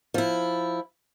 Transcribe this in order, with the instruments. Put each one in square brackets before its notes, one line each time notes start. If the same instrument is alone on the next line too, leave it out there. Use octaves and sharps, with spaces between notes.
[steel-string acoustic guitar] F3 E4